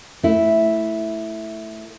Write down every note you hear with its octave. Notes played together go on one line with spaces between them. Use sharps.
A3 E4